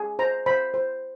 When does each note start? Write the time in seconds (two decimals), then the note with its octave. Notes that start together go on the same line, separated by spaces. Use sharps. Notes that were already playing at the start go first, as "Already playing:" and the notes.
Already playing: G#4
0.19 C5 A#5
0.46 C5 B5
0.74 C5